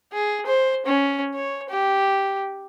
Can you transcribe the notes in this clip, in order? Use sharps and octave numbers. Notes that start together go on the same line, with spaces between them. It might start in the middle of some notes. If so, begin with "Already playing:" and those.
G#4
C5
C#4
C#5
G4